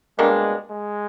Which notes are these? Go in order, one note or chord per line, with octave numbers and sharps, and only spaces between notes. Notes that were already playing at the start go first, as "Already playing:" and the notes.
B2 G3 G#3 A#3 D4
G#3